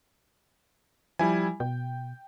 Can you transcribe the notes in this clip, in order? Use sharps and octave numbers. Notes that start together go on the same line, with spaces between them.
F3 G3 E4 G#5
B2 G5